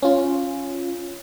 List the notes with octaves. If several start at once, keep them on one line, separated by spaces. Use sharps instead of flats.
C#4 F4